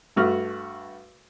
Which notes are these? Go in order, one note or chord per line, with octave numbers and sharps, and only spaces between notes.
G2 A3 F#4 F6